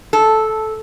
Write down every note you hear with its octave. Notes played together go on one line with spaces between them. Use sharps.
A4